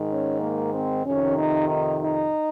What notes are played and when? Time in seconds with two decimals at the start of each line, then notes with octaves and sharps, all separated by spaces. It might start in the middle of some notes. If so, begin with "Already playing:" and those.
Already playing: G#2 D#3
0.08 C#4
0.39 A#3
0.72 C4
1.04 F2 C3 D#3 C#4
1.36 D#4
1.68 D#4
2.00 D#4